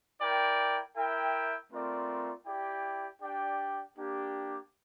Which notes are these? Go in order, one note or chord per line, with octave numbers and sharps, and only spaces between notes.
E4 A#4 D5 G5
E4 A#4 E5 G5
A3 C4 F4 A#4 D5
E4 G4 D5 G5
D4 G4 D5 G5
A#3 D4 G4